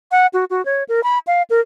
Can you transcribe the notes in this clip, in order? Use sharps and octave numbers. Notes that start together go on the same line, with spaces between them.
F#5
F#4
F#4
C#5
A#4
B5
F5
A#4